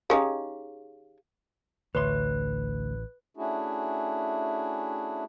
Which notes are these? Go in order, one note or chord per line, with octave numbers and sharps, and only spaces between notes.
D#3 C#4 D#4 G4 G#4 F5
A1 D2 B4 C#5 C6
A3 C#4 D4 E4 F#4 G#4